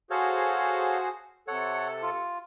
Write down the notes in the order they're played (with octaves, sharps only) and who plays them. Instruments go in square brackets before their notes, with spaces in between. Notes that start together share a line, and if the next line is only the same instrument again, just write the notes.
[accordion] F#4 G#4 C5 [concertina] A4 C#5 F5
[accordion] C3 A4 [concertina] C#5 F#5
[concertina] F4